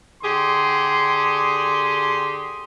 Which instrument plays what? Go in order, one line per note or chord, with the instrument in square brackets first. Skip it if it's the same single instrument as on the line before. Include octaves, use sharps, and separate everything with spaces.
[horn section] D3 G4 G#4 C6